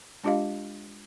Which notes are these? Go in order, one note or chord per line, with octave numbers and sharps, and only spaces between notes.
G#3 D4 F4 G4 D#5 F5